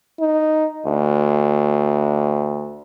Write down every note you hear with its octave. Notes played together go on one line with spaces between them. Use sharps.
D#4
D2